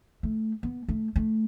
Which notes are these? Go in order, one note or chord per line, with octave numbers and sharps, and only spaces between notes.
A3
B3
A3
A3